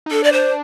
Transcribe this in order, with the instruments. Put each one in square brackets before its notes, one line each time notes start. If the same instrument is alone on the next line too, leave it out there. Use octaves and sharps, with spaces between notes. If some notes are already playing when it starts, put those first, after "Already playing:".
[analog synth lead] D#4
[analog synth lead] D4 [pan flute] A4
[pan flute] D5
C5